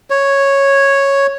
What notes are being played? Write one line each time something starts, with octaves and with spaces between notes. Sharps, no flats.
C#5